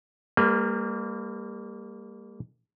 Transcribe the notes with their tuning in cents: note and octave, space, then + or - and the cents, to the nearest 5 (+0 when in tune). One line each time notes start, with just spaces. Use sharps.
G3 +35 A#3 -20 B4 +0